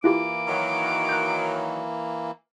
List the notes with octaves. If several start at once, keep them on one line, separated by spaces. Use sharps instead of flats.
E3 A#3 E4 F4 G4 D6
D#3 F#3
F#6 G6